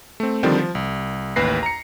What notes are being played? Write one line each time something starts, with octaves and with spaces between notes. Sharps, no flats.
A3 C4
D3 D#3 F3 G3 C4
F3
C2
A1 D#2 B4 A#6 C7
A#5 C#7